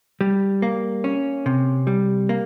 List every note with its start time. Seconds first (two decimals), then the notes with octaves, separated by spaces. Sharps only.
0.21 G3
0.62 A#3
1.04 C#4
1.46 C3
1.87 G3
2.29 A#3